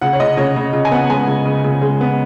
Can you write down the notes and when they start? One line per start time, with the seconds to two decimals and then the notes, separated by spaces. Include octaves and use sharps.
0.01 C#3 F#5
0.13 C#5
0.20 C#3 D#5
0.37 C#3 C#5
0.56 C#3
0.73 C#3
0.85 G#5
0.91 B3 F#5
1.10 G#3 G#5
1.27 C#3
1.45 C#3
1.64 C#3
1.82 G#3
2.01 B3